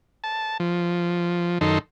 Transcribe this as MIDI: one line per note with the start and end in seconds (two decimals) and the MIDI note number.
0.24 0.57 81
0.60 1.58 53
1.61 1.79 42
1.61 1.79 51
1.61 1.79 63
1.61 1.79 69
1.61 1.79 84